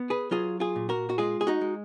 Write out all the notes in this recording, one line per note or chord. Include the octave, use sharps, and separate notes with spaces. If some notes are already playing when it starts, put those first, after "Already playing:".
Already playing: B3
G#4 B4
F#3 F4 G#4
F4 G#4
A#2
F#4 A#4
F#4
G#3 F4 G#4
G#4
D#4 F#4
G#3